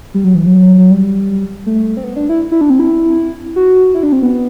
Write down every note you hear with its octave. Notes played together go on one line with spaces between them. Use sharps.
G3
F#3
E3
F#3
F#3
G3
A3
C4
B3
D4
E4
E4
D4
C4
E4
F#4
E4
D4
C4
B3